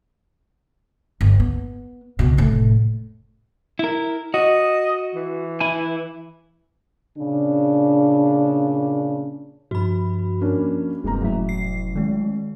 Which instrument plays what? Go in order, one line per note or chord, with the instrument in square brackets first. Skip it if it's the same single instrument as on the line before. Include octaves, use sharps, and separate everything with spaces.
[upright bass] G1
B3
C#2 B2
F1 A2
[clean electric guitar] E4 A#4
[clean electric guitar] F#4 [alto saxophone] D#5
[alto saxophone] E3
[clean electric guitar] E4 G#5
[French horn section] A#2 C#3 D4
[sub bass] G2 [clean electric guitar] F3 [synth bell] F#4 B5
[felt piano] A#3 C#4 D4
[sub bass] F1 [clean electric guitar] G2 A#3 C4 [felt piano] G#3 A#5
[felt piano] A1 [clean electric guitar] F#3 E5
[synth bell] C7
D#3 G#3